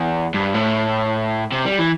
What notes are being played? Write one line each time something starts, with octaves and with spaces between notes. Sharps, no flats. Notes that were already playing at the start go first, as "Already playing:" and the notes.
Already playing: E2
G2
A2
C3
G3
E3